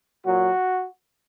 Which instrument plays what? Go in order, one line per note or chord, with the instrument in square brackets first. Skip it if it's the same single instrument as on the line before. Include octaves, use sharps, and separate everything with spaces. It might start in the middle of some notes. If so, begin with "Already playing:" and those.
[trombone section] A#2 F#3 F#4